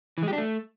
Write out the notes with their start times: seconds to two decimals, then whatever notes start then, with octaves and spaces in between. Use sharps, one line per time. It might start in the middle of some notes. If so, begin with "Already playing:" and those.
0.18 E3
0.23 G#3
0.28 G4
0.33 D4
0.38 A3